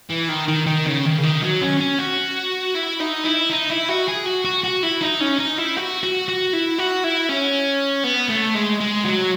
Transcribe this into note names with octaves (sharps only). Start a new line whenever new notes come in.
E3
D#3
D#3
D#3
C#3
D#3
C#3
D#3
F#3
C#4
C#4
F#4
E4
D#4
E4
D#4
E4
F#4
G#4
F#4
F#4
F#4
E4
D#4
C#4
D#4
E4
F#4
F#4
F#4
E4
F#4
E4
C#4
B3
A3
G#3
G#3
F#3